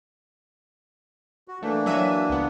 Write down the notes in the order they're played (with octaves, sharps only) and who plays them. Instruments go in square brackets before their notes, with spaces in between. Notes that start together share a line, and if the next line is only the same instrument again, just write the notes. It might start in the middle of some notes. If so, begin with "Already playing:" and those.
[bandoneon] F#4
[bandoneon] E3 A#3 D4 [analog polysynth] A3
[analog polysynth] F#3 E5 D#7
C#2 B3